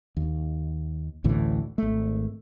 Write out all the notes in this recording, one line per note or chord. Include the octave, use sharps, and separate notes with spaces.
D#2
A1 D2 A2 E3
G#1 A3